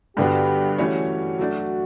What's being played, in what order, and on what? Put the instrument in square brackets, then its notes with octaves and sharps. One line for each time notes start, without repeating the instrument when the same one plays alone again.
[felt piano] G2 D3 G3 B3 F#4 [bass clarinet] G4
[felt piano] E3 A3 C#4 G4 C#5 [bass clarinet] F#4
[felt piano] F#3 A3 D4